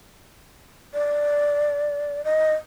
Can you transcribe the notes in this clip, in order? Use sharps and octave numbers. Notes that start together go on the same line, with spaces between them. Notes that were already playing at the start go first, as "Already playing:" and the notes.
D5
D#5